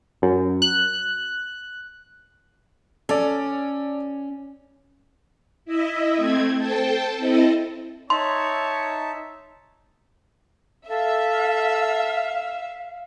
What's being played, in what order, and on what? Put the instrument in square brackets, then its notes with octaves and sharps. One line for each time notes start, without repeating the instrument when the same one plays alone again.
[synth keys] F#2
F#6
[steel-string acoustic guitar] C#4 [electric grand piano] A4 D5
[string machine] E4 D#5 E5
A3 C4 G#6
A4 C5 G5 A5
C4 E4 A4 D#5
[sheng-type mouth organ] D#4 E5 A5 [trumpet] C#5 [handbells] C6
[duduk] A4 [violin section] E5 [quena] F5